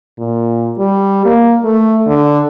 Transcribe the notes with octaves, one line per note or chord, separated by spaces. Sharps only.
A#2
G3
A#3
A3
D3